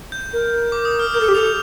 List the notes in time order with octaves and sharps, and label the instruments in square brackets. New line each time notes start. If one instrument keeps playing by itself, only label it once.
[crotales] G6
[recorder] A#4
[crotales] D6
D#6
F6
[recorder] A#4 [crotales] G6
[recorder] A4
G4
[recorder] A4 [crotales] F7